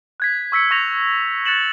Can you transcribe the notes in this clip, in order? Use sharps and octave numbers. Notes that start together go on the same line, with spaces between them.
F#6 G#6 B6
C#6 E6 B6 C#7
C#6 G6 A#6 F7
F#6 A6 C#7 E7 F#7